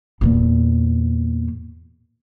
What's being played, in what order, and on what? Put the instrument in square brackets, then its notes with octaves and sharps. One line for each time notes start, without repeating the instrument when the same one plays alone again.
[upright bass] E2 A#2